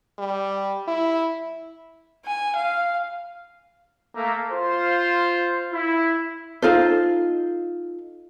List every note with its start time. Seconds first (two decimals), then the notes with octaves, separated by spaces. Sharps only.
0.19 G3
0.88 E4
2.25 G#5
2.56 F5
4.15 A3 A#3
4.52 F4 C5
5.73 E4
6.62 D#4 F4 A4 C5